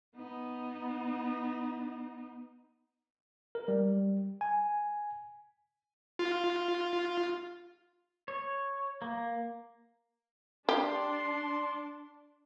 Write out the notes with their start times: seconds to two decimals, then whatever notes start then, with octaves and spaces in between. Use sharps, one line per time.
0.15 B3 D#4
3.55 A#4
3.68 G3
4.41 G#5
6.19 F4
8.28 C#5
9.02 A#3
10.69 D4 G4 C6